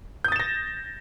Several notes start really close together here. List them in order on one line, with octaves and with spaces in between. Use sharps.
G6 D#6 A6 E7 A#6